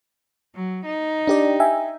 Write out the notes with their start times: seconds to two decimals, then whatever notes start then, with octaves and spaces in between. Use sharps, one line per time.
0.55 F#3
0.85 D#4
1.27 D4 G4 D5
1.60 E5 G5 G#5